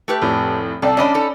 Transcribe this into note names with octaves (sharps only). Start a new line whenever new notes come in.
A3 G4 B4
F1 A2
C2 A4 D5 G5
F#2 C#4 D4 D5 D#5 B5
D#4 A4